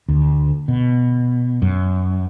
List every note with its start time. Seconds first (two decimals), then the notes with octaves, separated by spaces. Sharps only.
0.08 D2
0.68 B2
1.62 F#2